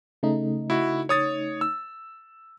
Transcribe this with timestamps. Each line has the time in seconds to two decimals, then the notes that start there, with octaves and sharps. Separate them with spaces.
0.23 C#3 A3 D#4
0.70 E4 F#4
1.09 C#5 D#6 A6
1.61 E6